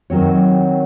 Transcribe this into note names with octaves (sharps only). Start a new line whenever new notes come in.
D#3 F#3 C4 C#5